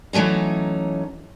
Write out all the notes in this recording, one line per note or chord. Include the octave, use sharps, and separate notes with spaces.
E3 F#3 A3 C#4 D#4